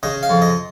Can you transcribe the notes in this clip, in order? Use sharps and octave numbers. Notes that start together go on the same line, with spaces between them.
C#3 D#5
F5
F2
D#5